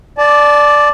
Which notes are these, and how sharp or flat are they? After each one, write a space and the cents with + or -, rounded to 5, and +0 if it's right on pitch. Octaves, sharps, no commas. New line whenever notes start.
D5 +0 A5 -25